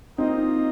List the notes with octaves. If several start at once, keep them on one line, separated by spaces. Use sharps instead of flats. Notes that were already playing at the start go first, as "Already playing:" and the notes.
A#3 C4 D#4 F4 A#4 D#5